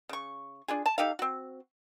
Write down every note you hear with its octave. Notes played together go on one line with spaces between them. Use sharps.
C#3 C#6
D4 F4 G#4
A5
D#4 G4 A4 F5
C4 F#4